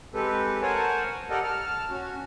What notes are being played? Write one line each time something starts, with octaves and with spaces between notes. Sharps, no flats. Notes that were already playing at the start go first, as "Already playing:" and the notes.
G#3 C4 G4 A4 B4
A#4 C5 C#5 F#5 G#5 A5
G4 A4 A#4 D5 D#5 F#5
A5 F6
C#4 F#4